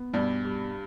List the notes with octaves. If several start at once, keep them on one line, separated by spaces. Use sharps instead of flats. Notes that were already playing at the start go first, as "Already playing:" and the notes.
Already playing: B3
G2 B2 G3
G3